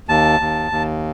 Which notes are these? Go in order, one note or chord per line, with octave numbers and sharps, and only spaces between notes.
D#2 A5
D#2
D#2